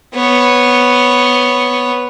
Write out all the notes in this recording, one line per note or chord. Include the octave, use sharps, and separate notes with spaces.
B3 C#5